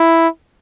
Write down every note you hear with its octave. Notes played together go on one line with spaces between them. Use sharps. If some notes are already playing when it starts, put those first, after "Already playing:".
Already playing: E4